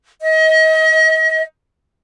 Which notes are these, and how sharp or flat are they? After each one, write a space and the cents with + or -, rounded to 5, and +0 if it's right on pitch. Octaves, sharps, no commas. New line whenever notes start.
D#5 +35